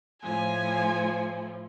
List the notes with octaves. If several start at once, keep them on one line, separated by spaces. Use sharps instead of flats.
A2 F3 G#5